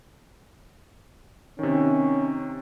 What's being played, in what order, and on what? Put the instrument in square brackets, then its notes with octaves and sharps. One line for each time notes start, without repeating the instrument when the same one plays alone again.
[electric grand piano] C3 D#3 [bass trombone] C#4